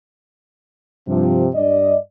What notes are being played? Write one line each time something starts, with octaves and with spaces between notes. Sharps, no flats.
G2 C3 F3
G2 D5 D#5